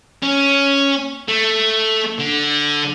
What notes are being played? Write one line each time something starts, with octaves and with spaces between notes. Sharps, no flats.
C#4
A3
D3